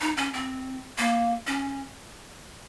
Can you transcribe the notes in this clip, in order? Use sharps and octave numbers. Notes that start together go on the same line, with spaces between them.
D#4
C#4
C4
A#3
C#4